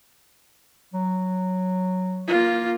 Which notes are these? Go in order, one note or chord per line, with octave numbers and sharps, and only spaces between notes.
F#3
A#3 F4